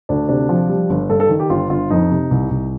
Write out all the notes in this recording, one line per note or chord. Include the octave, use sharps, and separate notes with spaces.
D2 D4
C3 D4
F3
G3
G1
G2 A4
A4
D#3
G4
G1 F4
G1 F4
F2 D#4
C3
C2
C2